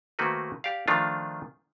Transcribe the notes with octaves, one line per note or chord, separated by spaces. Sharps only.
D#3 A3 A#3 C4 F#4 B4
G4 D5 F5
D#3 F3 A3 D4 F4